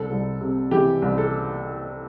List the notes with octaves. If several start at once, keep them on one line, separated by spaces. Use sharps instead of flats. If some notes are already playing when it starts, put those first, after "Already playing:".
Already playing: C2 A4
C2
C3
E3 G4
C2
A4